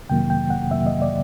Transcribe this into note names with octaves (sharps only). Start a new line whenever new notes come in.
F2 C3 D#3 F#3 A#3 G5
G5
F#5
F2 C3 D#3 F#3 A#3 E5
D#5
D5